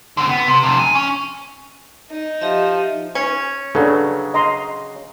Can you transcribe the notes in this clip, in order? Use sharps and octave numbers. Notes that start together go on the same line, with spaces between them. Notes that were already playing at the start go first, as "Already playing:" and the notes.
D3 C4
B3
C3
F2 C3
G#5
C#4
D#4
F3 G4 D#5 E5
C#4
C#3 F#3 D4 A4 B4
D#5 A#5 C6